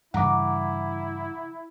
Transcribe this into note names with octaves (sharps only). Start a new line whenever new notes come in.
G2 C#3 E3 E4 F#5 A#5 D6